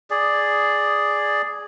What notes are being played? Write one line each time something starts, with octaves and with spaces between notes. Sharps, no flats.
G#4 D5